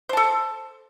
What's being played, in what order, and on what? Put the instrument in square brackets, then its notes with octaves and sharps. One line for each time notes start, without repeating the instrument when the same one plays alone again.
[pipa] C5
A5
A4